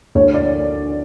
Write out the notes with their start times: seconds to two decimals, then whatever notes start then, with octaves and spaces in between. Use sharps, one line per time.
0.15 D2 C#5
0.34 D5